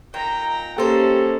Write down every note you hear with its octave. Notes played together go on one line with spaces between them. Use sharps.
A#2 D#4 G5 A#5
A#3 C#4 D#4 G4 A4 C5